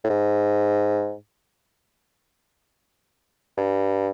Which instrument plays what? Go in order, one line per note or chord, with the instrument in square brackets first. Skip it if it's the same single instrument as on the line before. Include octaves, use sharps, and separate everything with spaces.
[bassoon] A2
G#2
G2